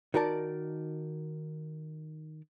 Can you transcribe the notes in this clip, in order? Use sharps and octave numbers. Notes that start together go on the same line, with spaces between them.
D#3 D#4 F#4 A#4 D5 A5